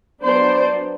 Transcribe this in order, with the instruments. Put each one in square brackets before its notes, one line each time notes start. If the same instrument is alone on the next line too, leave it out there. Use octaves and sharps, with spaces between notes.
[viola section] F#3 B3 D4 C5 D5